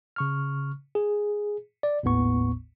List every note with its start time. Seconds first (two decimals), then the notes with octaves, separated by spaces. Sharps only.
0.16 C#3 C#6 F6
0.95 G#4
1.83 D5
2.03 G#1 D#2 A2 B3 C#6